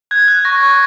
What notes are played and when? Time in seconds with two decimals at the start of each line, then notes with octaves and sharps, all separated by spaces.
0.11 F#6 G#6
0.28 F#6
0.45 C#6 A#6
0.63 C#6